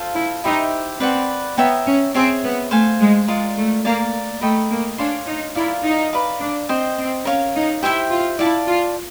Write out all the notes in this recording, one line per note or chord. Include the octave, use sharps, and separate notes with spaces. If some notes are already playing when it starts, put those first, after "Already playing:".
Already playing: F4 A4 C5 F5
E4
D#4 E4 G4 C5 E5
C4 B4 D5 F#5
B3 C#5 E5 G5 A#5
C#4
C4 G#4 C#5 E5
B3
A3 C5 F5 G#5
G#3
G#3 F4 A#4 D5
A3
A#3 D5 F5 A#5
A3 A#4 D#5 G5 B5
A#3
D4 C#5 F5 G#5 C6
D#4
E4 F4 A#4 D5 F5
D#4
B4 D5 F5 A#5
D4
C4 C5 D#5 G5
C4
C#4 A#4 C#5 F5
D#4
E4 G4 C5 E5 G5
F4
E4 D5 F5 A5
F4